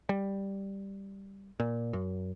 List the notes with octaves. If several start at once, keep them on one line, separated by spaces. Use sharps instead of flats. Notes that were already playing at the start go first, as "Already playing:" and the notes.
G3
A#2
F#2